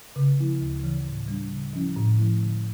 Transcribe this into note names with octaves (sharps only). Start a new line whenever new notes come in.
C#3
F3 A#3 E4
D2
C#3 E3
A2
G3 D4
C#3
F3 C#4 E4
A2
F3 A3 E4
D3